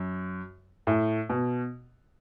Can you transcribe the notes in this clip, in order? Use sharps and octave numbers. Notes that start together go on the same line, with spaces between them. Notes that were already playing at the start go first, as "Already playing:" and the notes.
Already playing: F#2
A2
B2